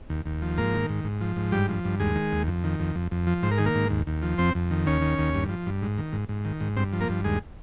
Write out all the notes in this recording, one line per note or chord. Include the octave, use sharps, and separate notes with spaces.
D#2
D#2
F3
G#2 A#3 A#4
D#3
G#2
G#2
F3
G#2
G2 G3 G4
F3
G2
D#2 G#3 G#4
D#3
D#2
F2
D#3
F2
F2
F2
F3
G#2 C5
A#4
D#3 G#4
A#3 A#4
G#2
D#2
D#2
F3
F2 C4 C5
F2
D#3
D#2 C#4 C#5
D#3
D#2
G2
F3
G2
G#2
D#3
G#2
G#2
D#3
G#2
G2 C4 C5
F3
A#3 A#4
G2
D#2 G#3 G#4